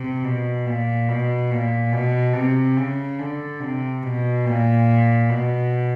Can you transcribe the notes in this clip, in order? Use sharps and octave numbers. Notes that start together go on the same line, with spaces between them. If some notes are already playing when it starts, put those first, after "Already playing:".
Already playing: C3
B2
A#2
B2
A#2
B2
C3
C#3
D3
C3
B2
A#2
B2